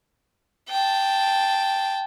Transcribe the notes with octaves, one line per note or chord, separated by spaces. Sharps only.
G5 A5